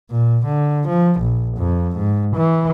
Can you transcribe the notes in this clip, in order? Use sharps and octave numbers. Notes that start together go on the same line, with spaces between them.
A#2
D3
F3
A#1
F2
G#2
E3